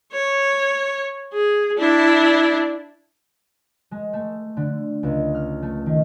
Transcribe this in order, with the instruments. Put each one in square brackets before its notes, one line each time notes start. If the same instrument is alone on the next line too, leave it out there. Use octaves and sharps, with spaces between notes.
[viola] C#5
G#4
D4 E4
[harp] G#3
A3
D3
C#2
F6
A3
D#3